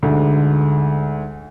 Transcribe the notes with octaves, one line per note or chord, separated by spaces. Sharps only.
D2 G#2 D3